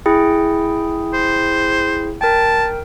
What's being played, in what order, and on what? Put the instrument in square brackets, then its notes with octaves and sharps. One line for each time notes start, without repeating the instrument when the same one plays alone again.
[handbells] E4 G#4 G5
[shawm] C5
[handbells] A#4 G5 [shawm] A5